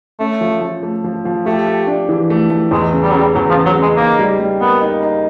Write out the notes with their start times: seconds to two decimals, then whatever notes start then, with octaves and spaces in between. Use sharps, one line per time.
0.20 A3 C#4
0.41 F3
0.61 F3
0.83 A3
1.04 F3
1.25 F3
1.46 A3 G4
1.67 G4
1.87 D4
2.09 E3
2.30 A3
2.50 A3
2.71 E2 G#3
2.92 C#3
3.03 G3
3.11 F#3
3.14 C#3 G3
3.35 E2 F#3
3.50 F3
3.56 C#3
3.65 F#3
3.77 C#3
3.82 G#3
3.97 A#3 D#4
4.19 G3
4.39 G3
4.61 A#3 B3
4.81 D#4
5.03 D#4